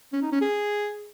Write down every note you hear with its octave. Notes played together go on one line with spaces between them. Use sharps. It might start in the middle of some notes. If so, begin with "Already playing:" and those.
C#4
D#4
C#4
G#4